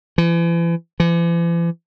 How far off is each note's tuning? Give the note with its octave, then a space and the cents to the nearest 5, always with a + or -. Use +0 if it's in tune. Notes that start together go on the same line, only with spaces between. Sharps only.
E3 +40
E3 +45